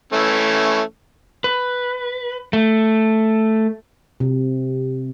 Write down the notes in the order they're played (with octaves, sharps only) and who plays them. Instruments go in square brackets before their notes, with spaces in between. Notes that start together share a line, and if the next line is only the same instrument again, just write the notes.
[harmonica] E3 A3 C#4
[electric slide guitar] B4
A3
[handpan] C3